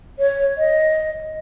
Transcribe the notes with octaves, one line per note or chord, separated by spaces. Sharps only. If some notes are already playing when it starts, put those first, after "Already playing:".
C#5
D#5